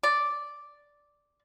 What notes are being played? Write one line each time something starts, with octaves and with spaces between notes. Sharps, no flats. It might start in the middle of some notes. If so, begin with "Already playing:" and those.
D5